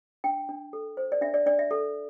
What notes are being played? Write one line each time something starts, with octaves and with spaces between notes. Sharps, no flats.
D4 G5
D4
A4
C5
D5
D4 E5
D5
D4 D5
E5
A4